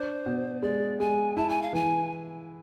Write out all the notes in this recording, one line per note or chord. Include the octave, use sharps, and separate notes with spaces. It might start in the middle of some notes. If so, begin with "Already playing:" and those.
Already playing: D4 C5
B2
G#3 D5
G#3 G#5
E4 A5
G#5
F5
E3 G#5